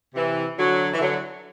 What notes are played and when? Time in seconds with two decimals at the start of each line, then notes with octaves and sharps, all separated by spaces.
0.14 C3 E3
0.58 D3 F#3
0.93 E3
1.01 D3 F#3